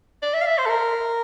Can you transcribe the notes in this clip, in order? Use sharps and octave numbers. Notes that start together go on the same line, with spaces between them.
D5
E5
F5
E5
C5
A4
A#4